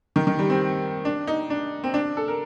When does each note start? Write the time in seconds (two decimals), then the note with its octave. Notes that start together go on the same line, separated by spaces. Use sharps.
0.16 D#3
0.27 D#3
0.39 G3
0.50 C4
1.05 D4
1.27 D#4
1.50 D4
1.84 C4
1.94 D4
2.17 A4
2.28 A#4